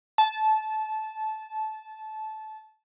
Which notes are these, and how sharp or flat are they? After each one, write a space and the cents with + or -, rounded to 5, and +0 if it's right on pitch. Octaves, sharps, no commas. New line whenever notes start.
A5 -20